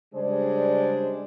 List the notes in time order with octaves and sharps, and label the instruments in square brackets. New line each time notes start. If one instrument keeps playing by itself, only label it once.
[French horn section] C#3 G3 G#3 D4 G#4 C5